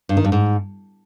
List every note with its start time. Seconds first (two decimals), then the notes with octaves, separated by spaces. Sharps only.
0.09 G2
0.17 D#3
0.24 G2
0.32 G#2